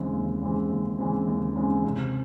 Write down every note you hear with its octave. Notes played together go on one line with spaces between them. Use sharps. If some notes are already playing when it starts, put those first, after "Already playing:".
Already playing: D#2 C#3 E3 G#3 C4
D#2
C#3 E3 G#3 C4
D#2
C#3 E3 G#3 C4
D#2
C#3 E3 G#3 C4
C3